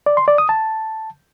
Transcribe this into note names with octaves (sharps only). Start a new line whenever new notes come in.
D5
C6
D5
D#6
A5